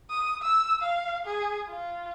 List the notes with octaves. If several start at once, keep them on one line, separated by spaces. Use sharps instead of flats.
D#6
E6
F5
G#4
F4